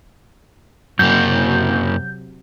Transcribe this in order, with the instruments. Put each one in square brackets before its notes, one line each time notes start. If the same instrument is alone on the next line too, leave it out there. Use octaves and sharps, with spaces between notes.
[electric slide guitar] F#2 A#3 [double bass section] C3 F#3 [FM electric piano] G6